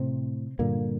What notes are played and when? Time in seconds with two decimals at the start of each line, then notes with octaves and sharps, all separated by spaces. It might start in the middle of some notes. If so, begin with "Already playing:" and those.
Already playing: A2 C3 C4
0.59 G2 A#2 D3 A#3